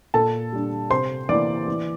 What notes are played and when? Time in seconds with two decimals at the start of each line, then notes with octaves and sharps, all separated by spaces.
0.14 A#2 A4 A5
0.53 G3 D4
0.90 C3 C5 C6
1.29 E3 A#3 D5 D6
1.68 E3